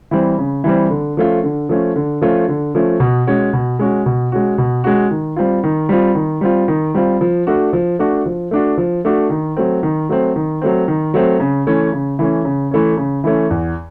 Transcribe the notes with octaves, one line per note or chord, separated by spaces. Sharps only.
E3 G3 C4
C#3
E3 G3 C4
D3
F3 A3 C#4 F4
D3
F3 A3 C#4 F4
D3
F3 A3 C#4 F4
D3
F3 A3 C#4 F4
B2
G#3 C#4 F#4
B2
G#3 C#4 F#4
B2
G#3 C#4 F#4
B2
G#3 C#4 F#4
D#3
G3 C4 F4
D#3
G3 C4 F4
D#3
G3 C4 F4
D#3
G3 C4 F4
F3
A3 D4 F#4
F3
A3 D4 F#4
F3
A3 D4 F#4
F3
A3 D4 F#4
D#3
F#3 A3 C4
D#3
F#3 A3 C4
D#3
F#3 A3 C4
D#3
F#3 A3 C4
C#3
E3 A3 C#4
C#3
E3 A3 C#4
C#3
E3 A3 C#4
C#3
E3 A3 C#4
E2